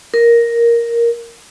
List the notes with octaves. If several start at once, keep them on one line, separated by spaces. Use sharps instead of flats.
A#4